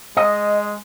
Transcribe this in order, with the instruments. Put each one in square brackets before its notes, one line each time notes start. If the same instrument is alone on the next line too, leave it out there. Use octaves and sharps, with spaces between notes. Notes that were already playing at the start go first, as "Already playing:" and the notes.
[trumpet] G#3 [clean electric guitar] D#5